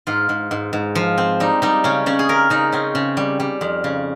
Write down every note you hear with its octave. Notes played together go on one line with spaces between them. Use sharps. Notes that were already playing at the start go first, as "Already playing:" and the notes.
G#2 F4
G#2
G#2
G#2
F3
C4
G3 D#4
G3 D#4
C#3 C#4
C#3 C#4
G#4
C#3 A#4
C#3 D#4
C4 C#4
C#3
G3
G3
F2
C#3